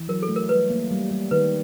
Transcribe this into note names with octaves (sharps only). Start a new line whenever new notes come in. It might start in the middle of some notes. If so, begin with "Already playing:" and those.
Already playing: E3
F#3 A#4
A4
A3
A#4
G3 B4
A#3
G3
G3
D#3 B4